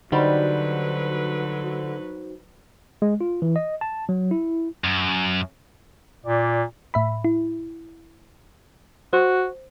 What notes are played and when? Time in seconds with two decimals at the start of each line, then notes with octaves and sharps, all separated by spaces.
0.12 D3 F#3 G3 D#4 F#4 B4 C5
3.02 G#3
3.21 F4
3.42 E3
3.56 D#5
3.81 A5
4.09 F#3
4.31 E4
4.84 F#2
6.25 A#2 D5
6.94 A2 E5 B5
7.25 E4
9.13 F#4 C5